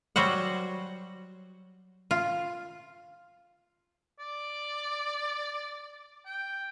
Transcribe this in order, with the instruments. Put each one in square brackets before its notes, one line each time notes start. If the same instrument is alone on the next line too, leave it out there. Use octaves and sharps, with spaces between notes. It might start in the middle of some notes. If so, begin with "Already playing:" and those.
[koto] F#3 G3 F#4 C5 F#5
F4
[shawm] D5
G5